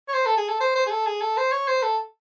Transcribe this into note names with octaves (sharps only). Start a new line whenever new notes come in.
C#5
C5
A4
G#4
A4
C5
C5
G#4
A4
G#4
A4
C5
C#5
C5
A4